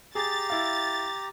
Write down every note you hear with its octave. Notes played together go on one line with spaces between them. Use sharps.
G4 G#4 A#5 A6
E4 F5